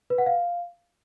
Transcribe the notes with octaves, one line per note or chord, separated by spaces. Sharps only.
B4
F#5
F5